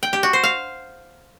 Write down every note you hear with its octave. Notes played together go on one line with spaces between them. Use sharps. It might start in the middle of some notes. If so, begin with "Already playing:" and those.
G5
G4
F#4
C5
F5